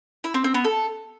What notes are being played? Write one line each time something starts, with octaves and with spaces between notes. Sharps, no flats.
E4
C4
C4
B3
A4